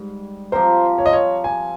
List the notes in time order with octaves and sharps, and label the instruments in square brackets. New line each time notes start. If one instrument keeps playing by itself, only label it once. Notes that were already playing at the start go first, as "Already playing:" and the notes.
Already playing: [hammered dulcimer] G#2 G3
[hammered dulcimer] F3 C4 G4 A#4 [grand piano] C5
[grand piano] C#5
D#5
C#5
G#5